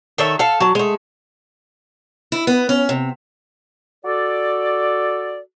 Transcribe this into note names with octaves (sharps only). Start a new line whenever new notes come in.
D#3 A4 C#5 E5
A4 F5
F#3 A5
G#3 A3
E4
B3
C#4
C3
F#4 A4 D5